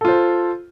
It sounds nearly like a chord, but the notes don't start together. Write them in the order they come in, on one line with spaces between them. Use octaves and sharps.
A4 F4 C5